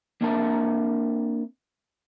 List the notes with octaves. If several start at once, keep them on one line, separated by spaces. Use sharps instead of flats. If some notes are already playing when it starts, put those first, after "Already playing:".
A#3 C4 D4 A#4 E5 A5